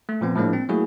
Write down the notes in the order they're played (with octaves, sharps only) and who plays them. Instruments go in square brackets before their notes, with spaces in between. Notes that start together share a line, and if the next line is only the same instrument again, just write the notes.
[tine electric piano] A3
A#2 F3 B3 C4
A2 F3 G#3 A#3 D4
C4
F#3 A3 A#3 E4 F#4 G#4